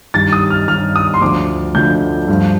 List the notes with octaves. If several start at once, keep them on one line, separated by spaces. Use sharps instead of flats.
G2 D#3 G3 A6
D#6
F6
G2 D#3 G3 F6
D#6
C6
D2 D3 F3 D6
D2 D3 F3 G6
G2 F3